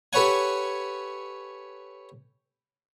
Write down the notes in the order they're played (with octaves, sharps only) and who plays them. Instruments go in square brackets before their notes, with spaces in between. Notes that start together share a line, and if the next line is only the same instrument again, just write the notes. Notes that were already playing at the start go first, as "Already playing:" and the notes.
[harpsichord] G4 A4 B4 C#5 F#5 G#5